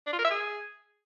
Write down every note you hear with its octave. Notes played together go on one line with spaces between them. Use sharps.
D4
F4
A#4
E5
G#4